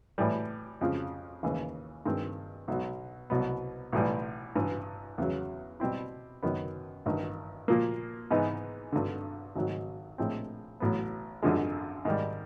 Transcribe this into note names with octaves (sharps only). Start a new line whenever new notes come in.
A2 E3 G3
F2 C#3 F3
D#2 C#3 E3
G2 D#3 G#3 C4
B1 B2 F#3
C2 B2 F#3 B3
B1 A2 E3 G3
A1 G2 E3
E2 C#3 F#3
B2 G3 C4 E4
F#2 D#3 F#3 B3
A1 G2 D#3
A#2 F3 A#3
G#2 E3 G#3 B3 D#4
G#1 G2 D3
G#1 G#2 D#3 F#3
A#1 A2 F3 G#3 C4
A1 A2 F#3 B3
G#1 F#2 D3 F3 G#3
G#2 D#3 G3